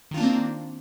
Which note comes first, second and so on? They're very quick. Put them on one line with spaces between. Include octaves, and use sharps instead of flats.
D#3 F4 D4 A#3 C4